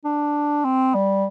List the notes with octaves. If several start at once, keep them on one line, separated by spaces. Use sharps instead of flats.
D4
C4
G3